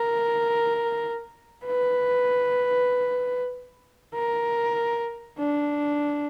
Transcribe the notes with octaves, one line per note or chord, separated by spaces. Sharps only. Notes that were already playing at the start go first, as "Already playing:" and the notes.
Already playing: A#4
B4
A#4
D4